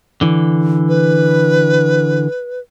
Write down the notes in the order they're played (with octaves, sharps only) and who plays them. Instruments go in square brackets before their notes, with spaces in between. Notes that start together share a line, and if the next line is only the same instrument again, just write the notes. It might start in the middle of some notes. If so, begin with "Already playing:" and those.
[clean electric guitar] D3 E3
[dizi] B4